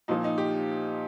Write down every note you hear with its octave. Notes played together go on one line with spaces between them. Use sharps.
A#2 F3 D#4
D#4
G4